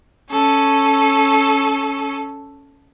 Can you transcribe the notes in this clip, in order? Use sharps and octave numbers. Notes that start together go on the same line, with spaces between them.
C#4 A4